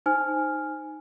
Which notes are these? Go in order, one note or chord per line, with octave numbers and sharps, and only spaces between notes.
D#4 C5 G#5 F6